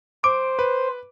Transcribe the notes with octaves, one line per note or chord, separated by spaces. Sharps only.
C5 D6 D7
B4